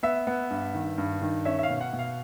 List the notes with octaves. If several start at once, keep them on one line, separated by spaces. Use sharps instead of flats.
B3 E5
B3
G2
D#3
G2
D#3
C#4 E5
E5
F5
B2
F#5
B2
F5